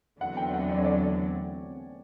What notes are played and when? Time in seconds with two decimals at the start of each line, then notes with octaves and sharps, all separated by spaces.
0.21 E2 D3 F#3 F#5
0.37 G5
0.54 F#5
0.69 D5
0.78 C#5
0.84 D5